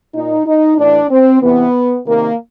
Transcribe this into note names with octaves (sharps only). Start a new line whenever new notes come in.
A#2 D#4
D#4
A2 E3 D4
C4
C3 E3 B3
C3 D#3 A#3